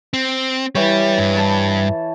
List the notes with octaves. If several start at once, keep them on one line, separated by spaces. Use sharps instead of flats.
C4
E3 G3 C#5
G2
A5 B5